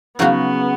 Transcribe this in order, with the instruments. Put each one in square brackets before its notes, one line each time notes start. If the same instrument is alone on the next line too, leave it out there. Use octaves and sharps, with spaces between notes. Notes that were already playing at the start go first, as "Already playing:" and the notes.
[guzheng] C#3 F#3 C#4 F#4 [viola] B3